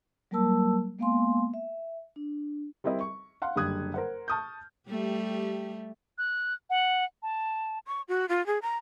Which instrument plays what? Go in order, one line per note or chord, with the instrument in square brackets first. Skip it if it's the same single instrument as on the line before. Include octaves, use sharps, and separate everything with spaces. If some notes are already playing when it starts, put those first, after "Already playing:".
[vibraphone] F#3 G3 A#3 A#4 A5 E6
G#3 A#3 B3 F5 G#5 C6
E5
D4
[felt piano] G3 C4 E4 A#4 D#5
C#6
F5 F#5 C6
F#1 D3 G3 D#6 F#6 G#6
A#4 C5 F#5
A5 C#6 D#6 F6 G6
[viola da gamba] G3 A3 G4
[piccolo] F#6
F#5
A5
[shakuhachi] C#6
F#4
F4
G#4
A#5